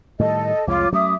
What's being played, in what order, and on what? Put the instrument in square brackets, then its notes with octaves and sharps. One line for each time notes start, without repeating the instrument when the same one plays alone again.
[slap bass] A2 D#3 G3 [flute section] A4 D#5
[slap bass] C2 F2 G#3 [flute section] F4 C#5 D6
[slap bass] F#3 A3 C#4 [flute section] E5 D6 D#6